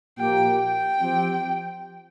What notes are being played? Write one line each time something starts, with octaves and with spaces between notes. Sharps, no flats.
A#2 F3 A#3 G4 G5
G5
F3 C4 G4